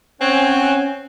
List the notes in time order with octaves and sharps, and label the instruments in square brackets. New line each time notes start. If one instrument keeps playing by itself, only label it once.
[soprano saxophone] C4 [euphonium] C#4 [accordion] C#5 F#5 G#5